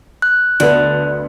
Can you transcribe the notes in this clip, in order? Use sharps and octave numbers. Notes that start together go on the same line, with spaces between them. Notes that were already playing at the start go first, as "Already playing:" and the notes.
F#6
D2 D3 B3